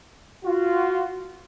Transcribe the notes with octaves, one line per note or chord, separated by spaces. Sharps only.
F4 F#4